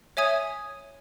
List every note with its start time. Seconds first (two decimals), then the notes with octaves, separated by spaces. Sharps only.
0.17 C#5 E5 G#5 D#6 G#6